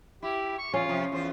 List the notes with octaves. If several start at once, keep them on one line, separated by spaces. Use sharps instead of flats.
E4 G4
C#6
E2 C#4 F4
C3 F3
E2 F4 C5